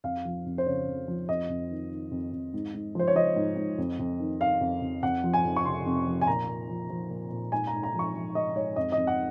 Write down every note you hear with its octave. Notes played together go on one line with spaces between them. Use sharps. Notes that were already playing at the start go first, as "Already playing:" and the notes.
F2 F5
F3
F2
C5
C#3 C#5
F2
F3
F2 D#5
F2
D#3
D#3
F2
F2
G#2
G#2
F3 C5
C#5
F3 D#5
G#2
G#2
F2
F2
D#3
D#3 F5
F2
F2
F2 F#5
F3
G#5
F2
C#6
C3 C6
F2
F3
G#5
A#2 A#5
A#2
F3
F3
A#2
A#2
G#2 G#5
A#5
G#2
A#5
F3 C#6
F3
G#2 D#5
G#2 C#5
F2 D#5
D#5
F2
F#5